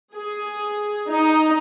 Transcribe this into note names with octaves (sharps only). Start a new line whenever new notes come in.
G#4
D#4